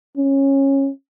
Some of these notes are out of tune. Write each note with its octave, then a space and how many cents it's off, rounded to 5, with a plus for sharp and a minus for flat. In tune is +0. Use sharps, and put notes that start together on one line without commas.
C#4 -15